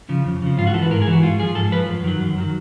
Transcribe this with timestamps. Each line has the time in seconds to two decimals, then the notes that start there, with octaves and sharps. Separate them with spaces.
0.09 C#3 F3
0.26 F2
0.42 C#3 F3
0.58 G#2 F4
0.67 F#4
0.74 E3 A4
0.82 B4
0.91 G#2 A#4
1.02 G#4
1.07 E3
1.13 F#4
1.23 G#2 F4
1.40 F3 G#4
1.55 G#2 A4
1.72 F3 B4
1.89 F#2
2.04 D#3 F#3
2.21 F#2
2.38 D#3 F#3